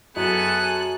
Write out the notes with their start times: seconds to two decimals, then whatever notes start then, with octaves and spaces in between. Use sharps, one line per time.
0.16 F#2 B3 G#4 A4 G#5 F#6